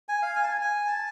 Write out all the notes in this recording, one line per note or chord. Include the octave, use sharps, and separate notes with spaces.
G#5
F5
G#5
A5
G#5
G#5
A5